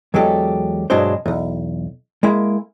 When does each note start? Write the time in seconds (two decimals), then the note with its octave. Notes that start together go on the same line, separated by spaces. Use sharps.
0.14 E2 F#3 G#3 G4 A4
0.90 G2 B2 F#3 G#3 D4 C5
1.26 B1 E2
2.23 G#3 A#3 E4